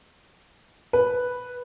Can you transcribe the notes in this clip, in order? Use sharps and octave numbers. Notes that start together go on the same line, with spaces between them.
B4